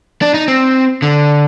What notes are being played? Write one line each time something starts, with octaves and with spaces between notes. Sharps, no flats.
D4
D#4
C4
D3